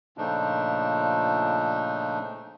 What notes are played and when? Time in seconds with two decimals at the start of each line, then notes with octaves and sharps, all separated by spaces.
0.18 A#2 C#3 F3 A3 D4 D#4